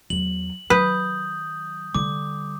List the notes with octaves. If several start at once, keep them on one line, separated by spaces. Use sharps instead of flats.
E2 F#3 F#7
D#3 F#3 B4 D#6 G6
D3 G3 D6